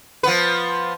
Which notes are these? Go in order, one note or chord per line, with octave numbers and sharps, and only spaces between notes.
F3 B3 B4